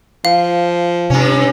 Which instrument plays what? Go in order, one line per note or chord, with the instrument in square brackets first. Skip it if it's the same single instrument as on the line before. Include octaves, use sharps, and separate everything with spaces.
[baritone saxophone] F3 [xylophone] F5
[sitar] G2 C#4 [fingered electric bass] C3